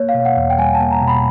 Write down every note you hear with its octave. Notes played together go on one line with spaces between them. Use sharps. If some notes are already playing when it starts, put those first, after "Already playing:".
Already playing: A#3 C#5
F5
B2
F#5
E2
G5
G3 G#5
A5
A#3
A#5
B2
B5